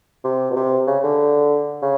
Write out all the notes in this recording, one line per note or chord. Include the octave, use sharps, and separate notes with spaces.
C3
B2
C3
C#3
D3
C#3